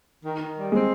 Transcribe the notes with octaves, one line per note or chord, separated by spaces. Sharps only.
D#3
D#3
G3
G#3 C4